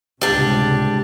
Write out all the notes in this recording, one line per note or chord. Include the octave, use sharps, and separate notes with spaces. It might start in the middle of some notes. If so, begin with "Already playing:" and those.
C#2 A2 C3 G3 D4